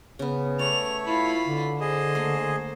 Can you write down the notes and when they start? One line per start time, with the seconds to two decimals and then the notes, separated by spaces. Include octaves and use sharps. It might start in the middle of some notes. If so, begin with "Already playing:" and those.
0.19 C#3 B3
0.59 A3 C#5 D5 F7
1.07 E4 F4 B5
1.47 D3
1.80 G#4 C5 D#5
2.15 A3 A#3